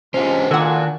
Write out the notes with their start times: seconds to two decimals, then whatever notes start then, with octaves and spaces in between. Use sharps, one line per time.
0.14 C#2 C#4 D4 G4 C5
0.51 C#2 A#2 D#3 D4 F#4 A4 F#5 G#5